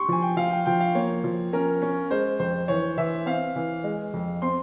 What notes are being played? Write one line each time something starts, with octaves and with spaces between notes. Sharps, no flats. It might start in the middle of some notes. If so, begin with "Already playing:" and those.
Already playing: G4 C6 C#6
F3 G#5
G5
F3 F5
G5
F3 G5
F5
A#3 C#5
F3
C#4 A#4
C#4
G#3 C5
F2 C5
E3 C#5
E3 E5
C4 F5
E3
G#3
F2
C4 C6